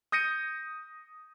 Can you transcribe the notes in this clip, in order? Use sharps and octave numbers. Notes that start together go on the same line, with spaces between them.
D#6 G6 A#6 C#7 D#7